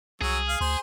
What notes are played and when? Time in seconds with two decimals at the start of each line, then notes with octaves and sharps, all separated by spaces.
0.22 C2 F#3 G#4 C#5 E6
0.48 F5
0.61 D2 C5